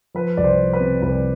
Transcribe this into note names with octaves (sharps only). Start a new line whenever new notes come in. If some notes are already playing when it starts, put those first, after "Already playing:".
F3 B4
C2 D5
C5
F3
B4
C3
C2 B4